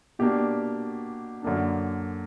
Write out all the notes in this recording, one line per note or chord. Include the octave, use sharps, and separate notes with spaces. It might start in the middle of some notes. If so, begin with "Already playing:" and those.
B2 A#3 D4 G4
F#2 D3 A#3 D4